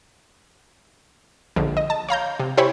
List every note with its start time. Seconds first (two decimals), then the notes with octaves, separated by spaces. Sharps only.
1.56 A#1 D3
1.77 D#5
1.90 A5
2.09 C#5 F5 A#5 G6
2.39 C3
2.57 E4 G4 C5 C#5 G#5 B5